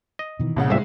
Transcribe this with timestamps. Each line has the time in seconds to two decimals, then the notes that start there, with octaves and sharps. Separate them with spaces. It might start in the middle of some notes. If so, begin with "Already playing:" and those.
0.19 D#5
0.40 B2 D#3 E3
0.56 C2 A#2 C#3 F#5
0.70 G1 F2 G#3 E5